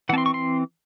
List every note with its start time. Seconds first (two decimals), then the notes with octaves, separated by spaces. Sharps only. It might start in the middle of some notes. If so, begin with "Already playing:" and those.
0.09 E3 F#5
0.13 C4 A5
0.18 C6
0.26 C#6
0.34 C6